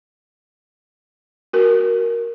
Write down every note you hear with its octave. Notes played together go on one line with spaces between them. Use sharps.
F#4 A#4